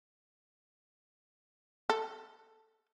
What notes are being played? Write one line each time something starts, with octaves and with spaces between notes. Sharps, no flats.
A4